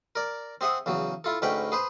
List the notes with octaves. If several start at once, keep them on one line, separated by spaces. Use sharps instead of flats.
A#4 D5
C4 G#4 E5 F#5 D#6
E2 C#3 F#3
E4 F4 A4
D2 G#2 C#4 B4 G5 B5
G#4 B4 C5